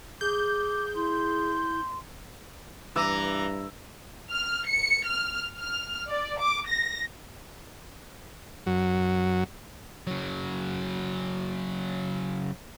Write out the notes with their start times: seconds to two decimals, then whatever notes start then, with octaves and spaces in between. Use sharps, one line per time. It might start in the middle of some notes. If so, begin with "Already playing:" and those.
0.21 G#4 D6 G6
0.95 E4 C6
2.96 G2 E3 A#5 D6 E6
4.31 F6
4.68 C#7
5.07 F6
5.58 F6
6.10 D5
6.40 D6
6.68 A#6
8.66 F#2 F#3
10.07 C#3 F#3